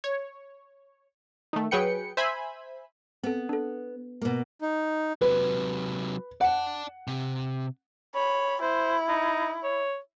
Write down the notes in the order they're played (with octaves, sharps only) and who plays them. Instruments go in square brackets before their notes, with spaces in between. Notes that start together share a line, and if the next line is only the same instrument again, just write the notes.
[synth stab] C#5
D#3 A3
F#3 G#4 B4 G5 C#7
C5 E5 G#5 B5
[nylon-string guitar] B3 [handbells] C4 A4
[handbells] D4 A4
[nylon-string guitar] B2 A#3
[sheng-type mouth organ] D#4
[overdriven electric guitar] C3 F#3 [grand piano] B4
[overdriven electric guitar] D5 A5 [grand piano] F#5
[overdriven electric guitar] C3
[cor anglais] C#5 [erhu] B5
[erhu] E4 [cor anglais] C5
[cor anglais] D#4
C#5